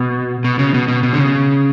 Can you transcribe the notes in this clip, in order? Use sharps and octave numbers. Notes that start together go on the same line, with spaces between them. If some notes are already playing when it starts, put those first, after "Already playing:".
Already playing: B2
B2
C#3
B2
B2
B2
D3
C#3